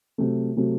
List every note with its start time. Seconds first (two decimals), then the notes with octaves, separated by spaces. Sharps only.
0.18 C3 F#3 A3
0.57 C3 F#3 A3